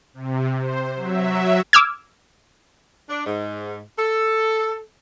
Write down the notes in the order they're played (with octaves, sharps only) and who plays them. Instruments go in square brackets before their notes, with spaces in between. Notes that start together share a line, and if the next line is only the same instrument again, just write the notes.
[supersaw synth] C3
C5
F#3 E5
[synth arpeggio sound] D6 E6 F6 G#6
[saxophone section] D4
G#2
A4